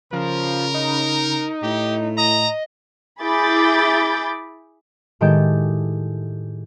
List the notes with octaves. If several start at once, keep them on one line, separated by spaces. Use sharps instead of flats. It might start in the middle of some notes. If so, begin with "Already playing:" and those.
C#3 F3 A#4
D#4
A2 G4
D#5 A#5
E4 G#4 B5 D6 G6 A6
A2 D#3 G#3 G4 A4 G6